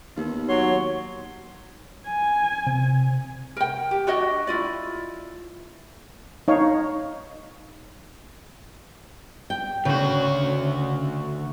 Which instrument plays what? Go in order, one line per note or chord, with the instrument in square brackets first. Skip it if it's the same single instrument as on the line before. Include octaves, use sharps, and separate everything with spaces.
[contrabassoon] D#2 [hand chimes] B3 D#4
[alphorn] F#3 [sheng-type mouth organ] C#5 C6
[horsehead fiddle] G#5
[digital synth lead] C3
[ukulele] A#4 G5
G4
D4 F#4 C#5 D#5
E4 F4 D5
[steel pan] D#4 C#5 F5
[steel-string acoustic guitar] G5
[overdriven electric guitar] D2 F#4 [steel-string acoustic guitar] C#3